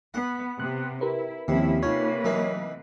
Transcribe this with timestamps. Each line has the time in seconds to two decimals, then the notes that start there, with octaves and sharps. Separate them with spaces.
0.14 B3 F#5
0.60 C3 B3 F#6
1.01 E4 G4 A#4 B4
1.48 D#2 C3 F3 C#4 E4
1.83 C3 A#3 C#4 D#4 F4 B4 C#5
2.25 E3 F#3 D#4 A#4 D#5